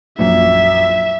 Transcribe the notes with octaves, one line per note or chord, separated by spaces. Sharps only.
A#1 F#2 E5